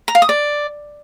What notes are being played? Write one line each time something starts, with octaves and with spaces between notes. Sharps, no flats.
A#5
F5
D#6
D5